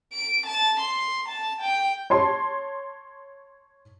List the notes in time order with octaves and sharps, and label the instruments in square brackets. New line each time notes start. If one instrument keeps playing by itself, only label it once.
[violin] D7
A5
C6
A5
G5
[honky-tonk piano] C#5 A5 C6